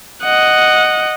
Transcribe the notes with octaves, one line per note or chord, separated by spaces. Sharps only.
D#5 F#5